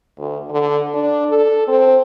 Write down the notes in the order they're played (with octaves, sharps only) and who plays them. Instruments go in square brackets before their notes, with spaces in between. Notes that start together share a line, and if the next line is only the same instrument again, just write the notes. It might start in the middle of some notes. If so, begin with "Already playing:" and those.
[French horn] D2
D3
D4
A4
C4